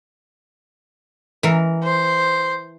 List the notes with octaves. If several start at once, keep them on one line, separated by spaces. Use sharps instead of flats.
E3 A#4
C5